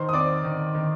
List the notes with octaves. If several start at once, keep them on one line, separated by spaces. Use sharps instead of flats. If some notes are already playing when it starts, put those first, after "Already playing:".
Already playing: D#3 C5 C6
D#6
C4 D5 D6
D#3
D#3